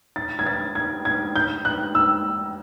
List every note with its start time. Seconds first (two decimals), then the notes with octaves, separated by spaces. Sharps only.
0.16 A6
0.39 G#6
0.46 A6
0.75 G#6
1.05 G#6
1.36 G6
1.65 F#6
1.95 E6